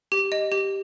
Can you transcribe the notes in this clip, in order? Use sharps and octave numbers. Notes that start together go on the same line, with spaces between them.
G4
D#5
G4